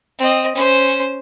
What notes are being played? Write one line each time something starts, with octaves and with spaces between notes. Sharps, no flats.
C4 D#5
C#4 C5